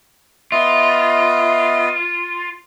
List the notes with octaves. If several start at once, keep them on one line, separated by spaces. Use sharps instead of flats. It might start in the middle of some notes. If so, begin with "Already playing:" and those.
B3 F4 D#5 E5